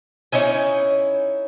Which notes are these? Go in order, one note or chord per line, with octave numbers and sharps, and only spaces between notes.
C#4 D#4 E4 G#5